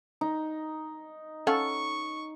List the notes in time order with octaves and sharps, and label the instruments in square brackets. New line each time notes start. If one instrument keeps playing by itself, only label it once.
[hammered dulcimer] D#4
[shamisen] C#4 F5 F#5 [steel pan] A4 [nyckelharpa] C#6